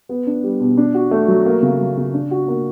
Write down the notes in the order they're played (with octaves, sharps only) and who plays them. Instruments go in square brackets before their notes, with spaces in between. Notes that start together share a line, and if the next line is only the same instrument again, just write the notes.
[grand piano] B3
D4
G3
B2
D4
F#4
A3
F#3
A#3
C#3
F#3
C#3
D4
F#4
A#3